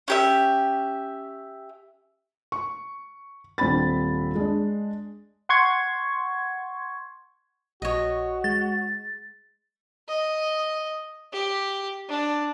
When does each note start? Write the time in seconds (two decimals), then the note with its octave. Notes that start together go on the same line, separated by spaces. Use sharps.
0.08 C#4 G4 E5
2.52 C#6
3.58 D#1 C4 D4 B5 A6
4.35 G#3 D4
5.49 F#5 C6 C#6 G#6
7.82 A#1 F#4 C#5 D#5
8.44 G#3 A6
10.09 D#5
11.33 G4
12.09 D4